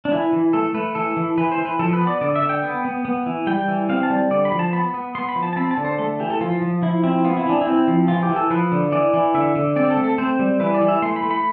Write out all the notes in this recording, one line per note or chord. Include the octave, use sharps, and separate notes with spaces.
D4
E3 E4
E3
A3 A4
A3 B4
E3 A4
E3
E3 B4
C5
E3
B4
F3 A4
B4
B3
D5
D3 D5
E5
D3
G5
B3
B3
B3
E3
G3 G5
E3
C4 F5
A5
G3
D3 D5
B5
F3
A5
B3 B5
B3
B3 C6
B5
F3
A5
A5
C4 B5
A5
D3
C5
A3 A4
E3 G4
A4
F3 F4
F3
F3 E4
C4 E4
B3 F4
E4
E3 D4
E4
C4
F3
E3 F4
G4
E3
A4
F3 B4
D3
E3 D5
E3
D3 E5
D3
C4 D5
A4
A3
A4
C4 C5
G3
E3 B4
D5
E3
E5
A3 C6
B5
A3
B5